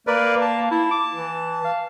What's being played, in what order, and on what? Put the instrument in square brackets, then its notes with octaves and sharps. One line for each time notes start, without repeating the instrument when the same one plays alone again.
[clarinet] A#3 [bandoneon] A#4 B4 D5
[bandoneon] A5
[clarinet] E4 [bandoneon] A5
[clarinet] D6
E3
F5